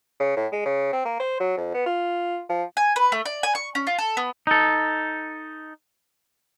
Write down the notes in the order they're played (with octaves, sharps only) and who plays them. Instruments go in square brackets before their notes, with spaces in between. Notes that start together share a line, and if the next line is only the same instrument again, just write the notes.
[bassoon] C#3
A2
G#3
C#3
C4
A#3
C5
F#3
F2
B3
F4
F3
[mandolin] G#5
B4
A3
D5
G#5
C#6
C#4
F4
A4
B3
[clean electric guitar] D#4 A4